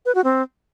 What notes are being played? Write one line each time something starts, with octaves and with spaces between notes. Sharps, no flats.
B4
F#4
C4